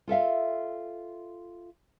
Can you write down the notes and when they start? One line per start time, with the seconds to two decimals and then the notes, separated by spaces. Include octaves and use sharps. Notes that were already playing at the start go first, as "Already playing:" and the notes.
0.08 F4 A4 E5 F5